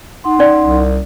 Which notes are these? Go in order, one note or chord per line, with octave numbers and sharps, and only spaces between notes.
D#4 F#5 C6
C#4 D5
C2